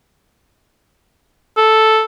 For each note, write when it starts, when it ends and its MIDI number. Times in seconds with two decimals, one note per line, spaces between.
1.57 2.03 69